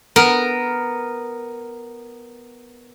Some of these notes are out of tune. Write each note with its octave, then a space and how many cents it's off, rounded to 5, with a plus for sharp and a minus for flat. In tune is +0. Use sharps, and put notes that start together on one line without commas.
B3 +0 A#4 +0